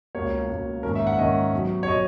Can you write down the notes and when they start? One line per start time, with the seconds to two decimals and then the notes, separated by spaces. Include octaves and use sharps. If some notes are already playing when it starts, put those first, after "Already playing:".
0.15 C#2 B2 A#3 C#5
0.50 C#2 B2 A#3
0.83 G#2 D#3 A#3 C#4 A#4
0.95 E5
1.07 F#5
1.18 G#2 D#3 A#3 C#4 D#5
1.53 B2 F#3 B3
1.83 C#5
1.88 B2 F#3 B3 D#5